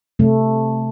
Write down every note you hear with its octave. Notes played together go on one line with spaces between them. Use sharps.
C3 A3